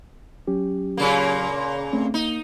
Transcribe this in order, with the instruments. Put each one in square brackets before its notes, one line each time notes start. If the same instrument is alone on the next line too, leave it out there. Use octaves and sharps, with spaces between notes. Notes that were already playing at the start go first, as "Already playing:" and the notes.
[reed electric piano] F#3 C#4 G4
[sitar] A#2 C#3 A#3
[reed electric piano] A3 C4 C#4
[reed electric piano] A#3 [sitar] D#4